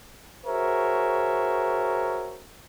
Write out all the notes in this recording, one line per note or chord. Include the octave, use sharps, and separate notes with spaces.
F#4 G#4 A#4 C5 C#5 E5